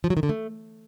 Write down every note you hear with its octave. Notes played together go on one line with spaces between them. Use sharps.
F3
F#3
D#3
D3
A3